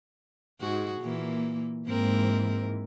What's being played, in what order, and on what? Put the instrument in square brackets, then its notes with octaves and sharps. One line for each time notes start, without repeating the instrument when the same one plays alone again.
[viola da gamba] G#2 F#4 G#4
A#2 E3 A#3
[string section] G#2 E3 [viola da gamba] A#3 C4 A#4